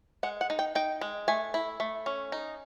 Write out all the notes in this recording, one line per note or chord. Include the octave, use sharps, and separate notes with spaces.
G#3 F#5
F#5
D#4
G5
D#4 G5
G#3
A3 G#5
E4
A3
C#4
D#4